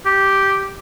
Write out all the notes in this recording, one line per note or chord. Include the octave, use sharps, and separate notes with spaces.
G4